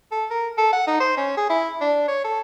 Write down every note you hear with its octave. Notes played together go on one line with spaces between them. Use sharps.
A4
A#4
A4
F#5
D#4
C5
C#4
G#4
E4
D4
C#5
A4